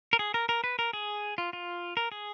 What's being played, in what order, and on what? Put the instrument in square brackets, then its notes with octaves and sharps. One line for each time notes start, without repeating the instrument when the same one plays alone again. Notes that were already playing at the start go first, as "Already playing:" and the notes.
[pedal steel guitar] A#4
G#4
A#4
A#4
B4
A#4
G#4
F4
F4
A#4
G#4